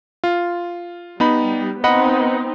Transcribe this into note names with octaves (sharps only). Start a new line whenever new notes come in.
F4
G3 B3 D#4 B5
B3 C4 D#4 D#5 F#5 B5